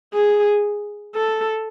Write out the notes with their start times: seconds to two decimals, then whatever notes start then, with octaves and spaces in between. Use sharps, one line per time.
0.13 G#4
1.15 A4